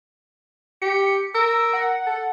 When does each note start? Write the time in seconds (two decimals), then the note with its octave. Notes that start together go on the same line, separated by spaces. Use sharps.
0.82 G4 C#7
1.34 A#4 E6
1.73 F#5
2.06 A4